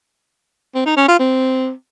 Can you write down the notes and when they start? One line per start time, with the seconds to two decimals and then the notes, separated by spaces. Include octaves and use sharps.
0.74 C4
0.86 D#4
0.97 C#4
1.08 F4
1.19 C4